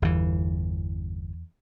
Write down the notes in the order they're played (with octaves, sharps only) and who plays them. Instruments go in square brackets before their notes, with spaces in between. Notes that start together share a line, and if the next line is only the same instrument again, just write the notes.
[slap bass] G1 E3 [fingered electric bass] E2